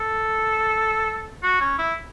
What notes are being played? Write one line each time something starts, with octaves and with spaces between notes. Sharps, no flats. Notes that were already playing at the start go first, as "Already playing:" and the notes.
Already playing: A4
F#4
C#4
E4